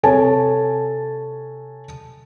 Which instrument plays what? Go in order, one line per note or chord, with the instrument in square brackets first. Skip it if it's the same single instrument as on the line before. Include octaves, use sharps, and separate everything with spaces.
[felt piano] C3 A4 C#5 G#5 A5